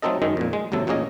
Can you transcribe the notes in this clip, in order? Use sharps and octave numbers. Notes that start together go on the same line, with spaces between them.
F#3 A3 C4 D#4 A4 D#5
F#2 D#3 G#3 D#4
F2 A#2
G#3
G#1 D#2 C3 F#3 A4
A1 A#2 A#3 C#4 G#4 D#5